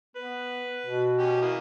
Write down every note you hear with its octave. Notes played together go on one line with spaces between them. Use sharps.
B3 B4
B2
C#4 G4
E3 A#3 D#6